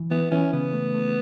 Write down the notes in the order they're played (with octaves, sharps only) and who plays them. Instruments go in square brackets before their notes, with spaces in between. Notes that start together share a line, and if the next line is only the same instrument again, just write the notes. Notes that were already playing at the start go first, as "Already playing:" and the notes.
Already playing: [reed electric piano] E3
[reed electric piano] E3 [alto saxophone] B3
[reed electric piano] E3 [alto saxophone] C#4
[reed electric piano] C#3 [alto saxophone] B3
[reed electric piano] A3
A3